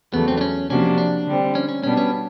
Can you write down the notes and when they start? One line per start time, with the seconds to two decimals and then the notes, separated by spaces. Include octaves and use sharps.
0.13 E2 C#3 F#3 A3 B3
0.28 C4
0.37 D4
0.41 C#4
0.70 C3 F3 A#3 C#4 D4 F#4
0.98 D4
1.27 D3 G3 C4
1.55 C#4
1.69 C#4
1.83 B2 G3 B3 C#4 D4
1.97 C#4